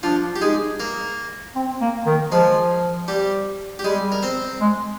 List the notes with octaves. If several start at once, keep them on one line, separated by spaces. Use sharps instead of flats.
F3 D4 F4
G4
G#3 D#4 G#4
A#3 A#4
C4
A#3
D#3
F3 G#3 G#4
G3 G4
G4
G3 G#3 G#4
A#4
C4 C5
G#3